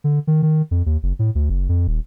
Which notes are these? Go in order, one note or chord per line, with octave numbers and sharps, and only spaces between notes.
D3
D#3
D#3
F2
D#2
F#1
A2
D2
F#1
F2
D#1